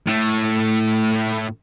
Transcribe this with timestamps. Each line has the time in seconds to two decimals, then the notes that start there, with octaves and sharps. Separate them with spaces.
0.07 A2 A3